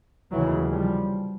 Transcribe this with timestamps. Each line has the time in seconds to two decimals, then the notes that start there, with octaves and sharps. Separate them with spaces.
0.32 F1 D#2 C#3 E3 F#3
0.72 F3 G3